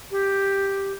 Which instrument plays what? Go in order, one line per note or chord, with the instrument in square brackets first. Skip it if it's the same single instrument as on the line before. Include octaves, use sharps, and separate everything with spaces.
[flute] G4